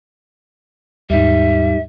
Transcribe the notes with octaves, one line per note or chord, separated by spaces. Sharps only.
D#2 G#2 G3 D#4 E5